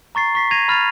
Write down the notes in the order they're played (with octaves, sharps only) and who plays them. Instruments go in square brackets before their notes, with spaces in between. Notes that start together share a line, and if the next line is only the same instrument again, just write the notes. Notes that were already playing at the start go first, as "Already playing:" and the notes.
[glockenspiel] A#5 C#6 A6 C7
C#6 B6 C7
G#6 A#6 D#7 F7
B5 F6 G#6 A6 F7